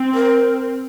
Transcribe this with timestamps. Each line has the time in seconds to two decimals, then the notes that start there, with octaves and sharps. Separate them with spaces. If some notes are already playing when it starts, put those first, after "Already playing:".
Already playing: C4
0.15 A#4